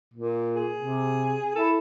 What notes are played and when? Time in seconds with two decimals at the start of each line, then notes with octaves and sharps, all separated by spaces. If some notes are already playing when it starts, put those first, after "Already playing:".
0.14 A#2
0.56 G#4
0.78 C3
1.56 E4 A4